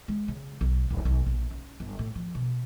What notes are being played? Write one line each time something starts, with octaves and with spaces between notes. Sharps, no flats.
G#3
C#3
B1
D1
B1
A#1
C#4
G1
A2
F3
B2